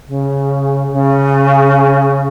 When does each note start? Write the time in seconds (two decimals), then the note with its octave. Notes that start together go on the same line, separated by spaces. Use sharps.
0.08 C#3
0.92 C#3